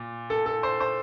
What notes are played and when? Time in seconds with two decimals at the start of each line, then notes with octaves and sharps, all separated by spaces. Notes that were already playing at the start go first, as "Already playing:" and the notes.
Already playing: A#2
0.30 A4
0.46 A4
0.63 C5
0.80 C5